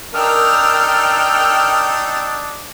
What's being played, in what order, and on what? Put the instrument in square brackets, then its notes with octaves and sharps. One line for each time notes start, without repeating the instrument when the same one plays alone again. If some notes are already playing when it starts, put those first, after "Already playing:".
[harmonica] D4 D#4 [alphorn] A#4 [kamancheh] G5 E6 [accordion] F6